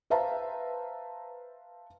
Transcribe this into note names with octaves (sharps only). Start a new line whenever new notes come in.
B4 C5 E5 F5 A5 A#5